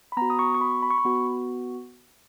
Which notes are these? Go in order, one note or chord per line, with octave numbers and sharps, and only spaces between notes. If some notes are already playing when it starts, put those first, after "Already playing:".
B5
B3 F#4 A#5
D#6
C#6
C#6
B5
B5
C#6
B5
B3 F#4